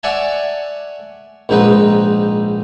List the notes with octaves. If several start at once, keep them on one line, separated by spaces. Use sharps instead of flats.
C#5 D5 E5 F#5 G#5 A5
A#1 G#2 C4 D#4 B4